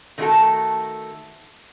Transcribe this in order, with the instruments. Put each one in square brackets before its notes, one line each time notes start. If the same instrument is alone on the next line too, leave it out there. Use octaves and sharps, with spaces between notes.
[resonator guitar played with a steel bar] D#3 A3 C#4 E4 F#4 A4